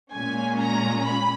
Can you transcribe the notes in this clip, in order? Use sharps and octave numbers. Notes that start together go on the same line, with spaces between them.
A#2 G#3 C#4 G#5
A#5
B5